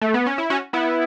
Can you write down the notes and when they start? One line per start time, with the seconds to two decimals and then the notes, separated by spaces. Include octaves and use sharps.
0.01 A3
0.14 B3
0.26 C#4
0.38 E4
0.50 C#4 F#4
0.73 B3 E4